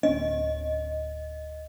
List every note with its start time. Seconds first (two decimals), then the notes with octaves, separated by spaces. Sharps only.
0.03 D1 C4 C#4 D#5